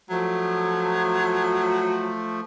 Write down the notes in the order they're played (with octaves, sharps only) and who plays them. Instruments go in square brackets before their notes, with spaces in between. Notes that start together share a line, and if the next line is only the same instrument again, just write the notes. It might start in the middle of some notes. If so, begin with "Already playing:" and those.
[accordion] F3 A3 [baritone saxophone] F#3